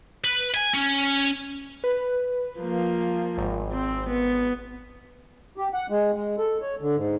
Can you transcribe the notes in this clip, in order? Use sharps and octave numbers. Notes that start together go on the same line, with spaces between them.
B4
G#5
C#4
B4
F3 A#3
G#1
C4
B3
G4
F#5
G#3
G#3
A4
C#5
D3
G#2